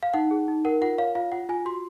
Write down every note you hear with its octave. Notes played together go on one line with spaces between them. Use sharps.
F5
D#4 F#5
G#4
D#4
A#4 F#5
F4 F#5
C#5 F5
F4 F5
F4 F#5
F4 G#5
F#4 C6